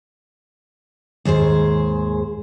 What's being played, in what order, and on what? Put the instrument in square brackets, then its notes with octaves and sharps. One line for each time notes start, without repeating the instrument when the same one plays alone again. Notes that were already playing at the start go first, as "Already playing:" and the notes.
[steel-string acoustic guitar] D#2 G#2 G#4 C5